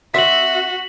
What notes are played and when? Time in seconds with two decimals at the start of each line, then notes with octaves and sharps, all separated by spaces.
0.14 C4 F#4 E5 B6 F#7